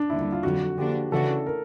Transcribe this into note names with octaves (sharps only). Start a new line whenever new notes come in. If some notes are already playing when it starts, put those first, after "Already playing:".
Already playing: D4
D#2 D3 G3 E4
E4
F4
F2 D3 F#3 F#4
D3 F3 A#3 D4 G4
C#3 E3 A3 D4 F#4 A4
A#4